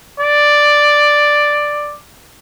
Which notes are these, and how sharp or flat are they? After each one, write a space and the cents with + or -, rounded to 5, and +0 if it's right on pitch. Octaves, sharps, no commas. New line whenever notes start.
D5 +5